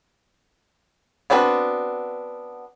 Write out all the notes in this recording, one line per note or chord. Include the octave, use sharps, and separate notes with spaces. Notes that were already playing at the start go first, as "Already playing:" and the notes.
B3 C4 D4 F#4 B4